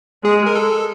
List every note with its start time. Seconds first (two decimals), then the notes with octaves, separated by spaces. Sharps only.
0.24 G#3 G#4
0.46 A#4
0.56 A4